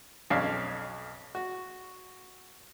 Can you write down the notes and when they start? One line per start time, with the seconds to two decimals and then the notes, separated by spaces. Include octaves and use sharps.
0.30 B1 F2 C#4 D4 F5
1.35 F#4